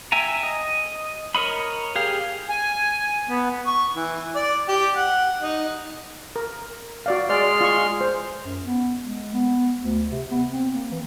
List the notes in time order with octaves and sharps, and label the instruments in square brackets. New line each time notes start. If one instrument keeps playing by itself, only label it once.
[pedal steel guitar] E5 G5 G#5 A#5
D#5
A#4 C#5 D#5 B5
G4 G#4 F5
[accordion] G#5
B3
[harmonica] C#6
E3
D5
G4
F#5
D#4
[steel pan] A#4
F#4 D5 F5
[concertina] G#3 C6 F6 [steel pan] D5
[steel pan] F4 C#6
C5
[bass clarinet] F#2
B3
G#3
B3
D2
C3
B3
C4
A#3
E3